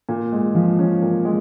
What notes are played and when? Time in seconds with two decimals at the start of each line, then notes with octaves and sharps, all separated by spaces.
0.09 A#2
0.33 G#3
0.55 F3
0.79 C#4
1.02 A#2
1.25 G#3